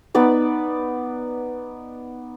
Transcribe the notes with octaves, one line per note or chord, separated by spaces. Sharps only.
B3 D#4 D5 B5